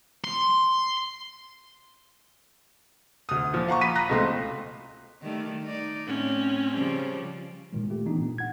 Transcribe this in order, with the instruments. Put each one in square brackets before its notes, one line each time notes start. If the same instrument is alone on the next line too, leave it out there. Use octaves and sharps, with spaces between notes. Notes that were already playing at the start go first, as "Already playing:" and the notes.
[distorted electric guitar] C6
[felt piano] D2 D#6
A#2 F3
F5 F#5 A#5 C#6
B5 B6 D#7
A#5 F#6 A#6
C#2 B2 A3 C4 C6
[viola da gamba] D#3 G3 A3
D#4 D5
[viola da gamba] A2 [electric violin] C4 C#4
[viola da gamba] C#3 F3 G3
[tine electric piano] A#2 D#3 G#3
A3 F4 G4
E3 B3 D4 D#4
A#2
F#5 G#6